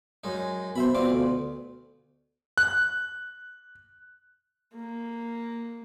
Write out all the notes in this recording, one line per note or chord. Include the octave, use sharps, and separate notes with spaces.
F#2 G#3 D#4
B2 C5 E5 B5
B2 C4 F4 D5
D2
F#6
A#3